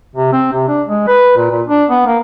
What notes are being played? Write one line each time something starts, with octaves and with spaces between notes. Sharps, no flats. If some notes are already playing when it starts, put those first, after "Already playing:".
C3
C4
C3
D4
G#3
B4
A#2
A#2
D4
B3
A#3